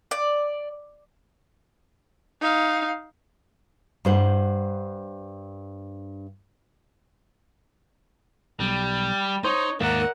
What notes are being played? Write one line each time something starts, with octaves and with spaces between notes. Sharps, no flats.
D5
D#4 F5
G2 C5 F#5
B1 G3
D#4 C5 C#5
D#2 G#2 A#3 A#4 D5 E5 F#5